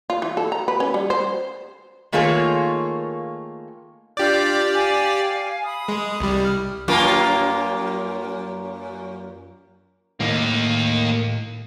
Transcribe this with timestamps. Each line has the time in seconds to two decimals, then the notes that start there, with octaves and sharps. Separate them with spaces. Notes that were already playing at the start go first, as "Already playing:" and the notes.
0.10 F4
0.22 E3
0.37 A4
0.52 A#5
0.68 B4
0.80 C#4
0.94 G3
1.10 C5
2.12 D#3 A3 A#3 F4 G#4 C#5
4.17 D4 F4 G4 D5 G6
4.75 F5 G#5
5.64 B5 D#6
5.88 G#3
6.20 C2 G3
6.43 F6
6.88 F#2 A#3 F4
10.21 A2 D#3 A#3 D#5